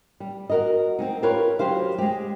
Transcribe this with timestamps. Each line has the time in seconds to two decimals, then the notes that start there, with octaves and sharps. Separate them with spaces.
0.20 G3
0.50 F#4 A#4 D#5
0.99 C4 C#4 D#4
1.23 F4 G4 A#4 B4 C#5
1.59 F#3 G4 C5 F5
1.98 G#3 G4